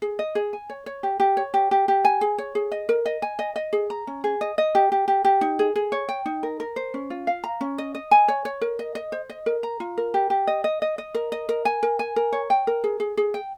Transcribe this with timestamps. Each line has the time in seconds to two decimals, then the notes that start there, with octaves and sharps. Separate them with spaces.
0.02 G#4
0.19 D#5
0.35 G#4
0.53 G#5
0.70 C#5
0.86 C#5
1.03 G4
1.20 G4
1.37 C#5
1.54 G4
1.71 G4
1.88 G4
2.05 G#5
2.21 G#4
2.38 C#5
2.55 G#4
2.72 D#5
2.89 A#4
3.06 D#5
3.22 G#5
3.39 D#5
3.56 D#5
3.73 G#4
3.90 A#5
4.07 C#4
4.24 G#4
4.41 D#5
4.58 D#5
4.75 G4
4.92 G4
5.08 G4
5.25 G4
5.41 D#4
5.59 G#4
5.76 G#4
5.92 C#5
6.09 G5
6.26 D#4
6.43 A#4
6.60 A#4
6.76 C5
6.94 C#4
7.10 F4
7.27 F5
7.44 A#5
7.61 C#4
7.78 D#5
7.95 D#5
8.11 G#5
8.28 C#5
8.45 C#5
8.61 A#4
8.79 D#5
8.95 D#5
9.12 C5
9.30 D#5
9.46 A#4
9.63 A#5
9.80 F4
9.98 A#4
10.14 G4
10.30 G4
10.47 D#5
10.64 D#5
10.82 D#5
10.98 D#5
11.14 A#4
11.32 D#5
11.49 A#4
11.65 G#5
11.83 A#4
11.99 G#5
12.16 A#4
12.32 C#5
12.50 G5
12.67 A#4
12.84 G#4
13.00 G#4
13.17 G#4
13.34 G5